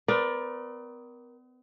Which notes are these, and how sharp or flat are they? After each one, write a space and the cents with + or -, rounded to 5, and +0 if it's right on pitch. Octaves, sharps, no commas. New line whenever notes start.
B3 +40 A#4 +30 D5 +0